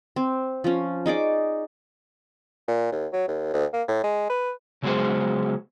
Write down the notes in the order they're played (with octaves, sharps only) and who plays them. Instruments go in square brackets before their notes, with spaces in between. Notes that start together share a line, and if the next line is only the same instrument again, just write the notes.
[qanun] C4
F3 C#4
D#4 G#4 D5 D6
[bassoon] A#2
D#2
F#3
D#2
D2
A#3
A2
G#3
B4
[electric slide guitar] C#3 F#3 G#3 B3 G#4 C5